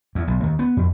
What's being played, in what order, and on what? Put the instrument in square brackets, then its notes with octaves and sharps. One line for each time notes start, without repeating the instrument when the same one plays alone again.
[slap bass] E2
B1
D#2
B3
F2